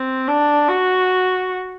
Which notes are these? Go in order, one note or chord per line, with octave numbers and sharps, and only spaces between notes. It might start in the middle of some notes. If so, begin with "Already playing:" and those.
Already playing: C4
D4
F#4